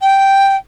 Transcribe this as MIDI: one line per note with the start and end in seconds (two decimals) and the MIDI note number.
0.01 0.56 79